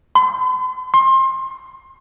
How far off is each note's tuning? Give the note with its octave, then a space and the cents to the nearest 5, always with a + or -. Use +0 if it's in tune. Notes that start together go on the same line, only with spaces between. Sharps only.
C6 -45
C6 +25